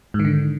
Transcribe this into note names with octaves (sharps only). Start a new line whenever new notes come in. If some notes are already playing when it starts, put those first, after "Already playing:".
G#2
D#3
D3